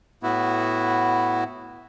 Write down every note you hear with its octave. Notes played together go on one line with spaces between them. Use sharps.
A2 B3 E4 F#4